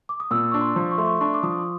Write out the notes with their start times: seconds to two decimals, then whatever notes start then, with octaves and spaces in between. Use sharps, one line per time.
0.09 D6
0.20 D#6
0.31 A#2 E6
0.51 D4 C#6
0.61 C6
0.76 F3
0.91 C#6
0.98 A3 C6
1.06 C#6
1.21 D4 C#6
1.34 D6
1.43 F3 D#6